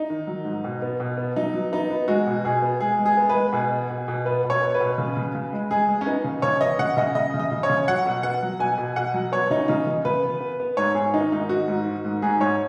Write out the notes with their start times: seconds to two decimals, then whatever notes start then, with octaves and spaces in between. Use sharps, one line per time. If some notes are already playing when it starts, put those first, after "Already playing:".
Already playing: D#4
0.10 D#3
0.27 F#3
0.45 G#2
0.64 B2
0.82 B3
1.00 B2
1.17 B3
1.36 F#3 D#4
1.53 F#3
1.72 B3 D#4
1.90 B3
2.08 G#3 F#4
2.27 B2
2.45 B2 G#4
2.62 B3
2.81 G#3 G#4
2.99 G#3
3.06 G#4
3.17 B3
3.29 B4
3.35 G#3
3.53 B2 G#4
3.71 B3
3.90 B2
4.08 B2
4.25 B3 B4
4.44 B2
4.50 C#5
4.61 B3
4.75 B4
4.81 B2
4.98 C#3
5.17 C#3
5.35 C#3
5.53 G#3
5.71 G#3 G#4
5.89 G#3
6.01 C#4
6.06 B3 D#4
6.24 C#3
6.42 C#3 C#5
6.60 B3 D#5
6.79 C#3 F#5
6.97 C#3 D#5
7.15 C#3 D#5
7.34 C#3
7.39 D#5
7.52 C#3
7.63 C#5
7.69 C#3
7.88 F#3 F#5
8.06 B2
8.23 B3 F#5
8.43 F#3
8.60 B2 G#5
8.78 B2
8.96 B2 F#5
9.14 F#3
9.32 B3 C#5
9.50 C#3 D#4
9.68 C#3 D#4
9.87 C#3
10.05 C#3 B4
10.23 B3
10.41 B3
10.60 B3
10.77 G#2 C#5
10.95 G#2 G#4
11.14 D#3 D#4
11.32 G#2 D#4
11.49 D#3 F#4
11.68 G#2
11.86 D#3
12.05 G#2
12.22 G#2 G#4
12.40 G#2 C#5